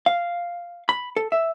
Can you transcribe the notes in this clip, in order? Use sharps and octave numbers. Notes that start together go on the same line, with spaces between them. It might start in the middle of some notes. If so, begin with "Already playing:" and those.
F5
B5
A4
E5